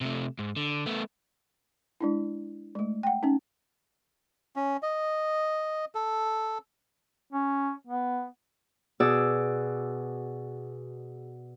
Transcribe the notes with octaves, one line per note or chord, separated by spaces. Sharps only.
C3 A3
G#2
D3
A3 B3
G#3 D4 E4
G#3 A3
F#5 G5
C#4 D#4
C#4
D#5
A4
C#4
B3
B2 F#4 G#4 D5 E6